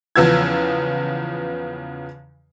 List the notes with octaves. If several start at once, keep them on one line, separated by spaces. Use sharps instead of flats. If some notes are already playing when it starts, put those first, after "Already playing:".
E2 C#3 F3 B3 E6 G#6